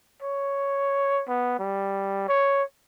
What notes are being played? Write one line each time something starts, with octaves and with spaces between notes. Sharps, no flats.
C#5
B3
G3
C#5